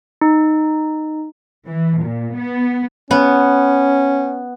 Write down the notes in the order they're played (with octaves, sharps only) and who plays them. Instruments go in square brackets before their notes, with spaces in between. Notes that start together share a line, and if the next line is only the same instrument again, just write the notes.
[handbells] D#4
[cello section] E3
A#2
B3
[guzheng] B3 [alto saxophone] C#4